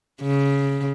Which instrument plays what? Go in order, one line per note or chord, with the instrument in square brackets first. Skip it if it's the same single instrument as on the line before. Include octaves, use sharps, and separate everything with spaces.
[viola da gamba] C#3